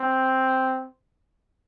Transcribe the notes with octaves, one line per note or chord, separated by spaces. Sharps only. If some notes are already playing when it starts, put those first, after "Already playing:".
Already playing: C4